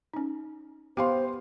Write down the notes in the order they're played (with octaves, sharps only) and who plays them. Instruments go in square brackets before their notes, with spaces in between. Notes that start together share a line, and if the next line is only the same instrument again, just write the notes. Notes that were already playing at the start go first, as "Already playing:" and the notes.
[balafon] C#4 D#4
[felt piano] B3 F5 C6 [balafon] G4 G5 [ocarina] C5